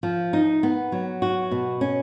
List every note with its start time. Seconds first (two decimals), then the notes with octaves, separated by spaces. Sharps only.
0.03 F3
0.33 D#4
0.63 B3
0.92 F#3
1.22 F#4
1.51 B2
1.81 C#4